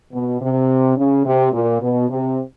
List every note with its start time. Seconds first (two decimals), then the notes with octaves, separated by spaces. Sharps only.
0.12 B2
0.41 C3
0.97 C#3
1.25 C3
1.53 A#2
1.81 B2
2.09 C3